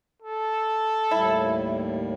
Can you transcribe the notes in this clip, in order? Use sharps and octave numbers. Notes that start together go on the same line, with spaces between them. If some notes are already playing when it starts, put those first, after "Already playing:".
A4
D#2 A2 G3 E4